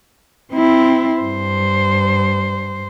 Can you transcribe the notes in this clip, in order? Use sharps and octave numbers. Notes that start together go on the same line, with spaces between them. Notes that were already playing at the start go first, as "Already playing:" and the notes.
C4 E4
G2 C5